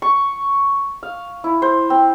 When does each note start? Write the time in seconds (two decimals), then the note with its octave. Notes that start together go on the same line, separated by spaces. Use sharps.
0.02 C#6
1.03 F5
1.44 E4
1.62 C5
1.90 C4